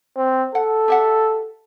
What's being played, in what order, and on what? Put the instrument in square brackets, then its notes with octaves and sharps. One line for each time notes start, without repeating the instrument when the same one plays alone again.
[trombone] C4
[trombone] A4 [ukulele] F#5
[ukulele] G4 E5 F#5